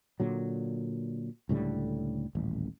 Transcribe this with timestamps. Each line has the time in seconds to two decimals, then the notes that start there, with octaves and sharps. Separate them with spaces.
0.20 A#2 D3 F#3
1.49 C#2 A2 D3 G3
2.35 D#1 A1